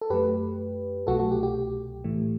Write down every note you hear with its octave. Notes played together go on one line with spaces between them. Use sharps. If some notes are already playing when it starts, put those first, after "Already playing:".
A4
F#2 F#3 A3 G4 B4
C2 B2 F#3 A3 F#4 A4
F#4
G4
G4
A2 E3 A3